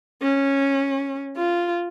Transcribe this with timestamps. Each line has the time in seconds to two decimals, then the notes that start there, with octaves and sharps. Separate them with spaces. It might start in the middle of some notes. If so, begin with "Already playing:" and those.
0.22 C#4
1.36 F4